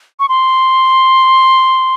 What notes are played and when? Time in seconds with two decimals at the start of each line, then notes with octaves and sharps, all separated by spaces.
0.20 C#6
0.29 C6